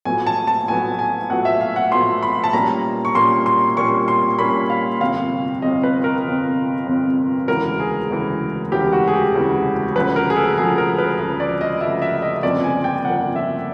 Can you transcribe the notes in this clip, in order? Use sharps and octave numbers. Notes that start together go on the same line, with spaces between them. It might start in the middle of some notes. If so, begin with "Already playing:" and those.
A#1 A2 F#3 B3 G#5
A5
A5
A#1 A2 F#3 B3 G#5
G#5
A#1 A2 F#3 B3 F#5
E5
F5
F#5
A#1 A2 F#3 B3 C6
B5
A5
A#2 G3 A#3 C#4 A#5
C#6
A#2 G3 A#3 C#4 C6
C6
A#2 G3 A#3 C#4 C#6
C6
A#2 G3 A#3 C#4 B5
F5
G1 F2 C3 F5
G1 F2 C3 D#5
B4
A#4
G1 F2 C3
G1 F2 C3
E1 D2 C#3 E3 A#4
G#4
E1 D2 C#3 E3
E1 D2 C#3 E3 G4
F#4
G#4
G4
E1 D2 C#3 E3
D2 C#3 F3 B4
A#4
G#4
A4
D2 C#3 F3 G#4
A#4
B4
D2 C#3 F3
D5
D#5
D2 C#3 F3 E5
E5
D#5
G1 F2 C#3 F3 A#3 D5
G#5
G5
G1 F2 C#3 F3 A#3 F#5
E5